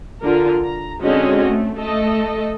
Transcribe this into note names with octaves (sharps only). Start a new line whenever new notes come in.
D3 F4 A#4
A#5
D3 G#3 C4 C#4 F#4 D#5
A3
A3 A4 D#5